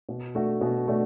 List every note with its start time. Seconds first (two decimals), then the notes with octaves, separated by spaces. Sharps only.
0.09 B2
0.35 A3 D4 F#4
0.61 B2
0.88 A3 D4 F#4